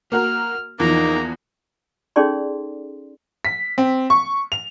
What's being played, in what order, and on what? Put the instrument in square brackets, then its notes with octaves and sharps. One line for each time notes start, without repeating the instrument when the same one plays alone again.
[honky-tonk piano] A#3 F#4 A#4 [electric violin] F6
[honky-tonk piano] E2 E3 F3 [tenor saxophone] A#3 [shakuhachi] D#4 [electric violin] A#5
[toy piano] C#4 D#4 G#4 A4 D5 C6
[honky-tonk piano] B6
C4
C#6
F7